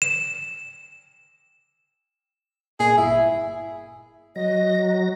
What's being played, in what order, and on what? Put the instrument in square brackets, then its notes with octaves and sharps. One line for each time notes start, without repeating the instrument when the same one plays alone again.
[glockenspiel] E7
[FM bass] A#2 [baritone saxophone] G#4
[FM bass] G1 [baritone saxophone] E4
[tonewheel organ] F#3 A#6 [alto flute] D#5